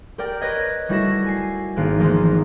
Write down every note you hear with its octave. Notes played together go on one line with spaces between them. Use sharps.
G4 A#4 D5 G5
B4 C#5 D#5 G#6 A#6
G3 A3 E4 F#4 A#6 E7
G#5 C7
G#1 A#3 F#6
E3 F3 G#3 A#3 B3 D#4